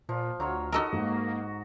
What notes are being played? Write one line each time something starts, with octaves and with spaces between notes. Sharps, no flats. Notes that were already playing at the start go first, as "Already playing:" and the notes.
A#2 F3
D2 F#3 F4 C#5
D#4 F#4 A4 A#4 D#5
G#2 A#3